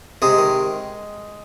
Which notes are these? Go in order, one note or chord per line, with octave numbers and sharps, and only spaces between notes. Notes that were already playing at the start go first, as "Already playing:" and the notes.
C3 G#3 G#4
D#3